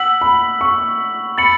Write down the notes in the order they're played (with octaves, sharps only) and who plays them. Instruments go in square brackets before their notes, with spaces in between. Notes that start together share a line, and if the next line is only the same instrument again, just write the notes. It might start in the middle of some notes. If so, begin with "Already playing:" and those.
Already playing: [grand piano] F#5 [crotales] E6 B6 F#7
[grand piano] B5
C#6
[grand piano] B5 [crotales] A6 C#7 F#7